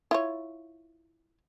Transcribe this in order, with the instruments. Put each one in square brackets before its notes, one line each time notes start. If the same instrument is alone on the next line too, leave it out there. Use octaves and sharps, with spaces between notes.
[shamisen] E4 F4 C#5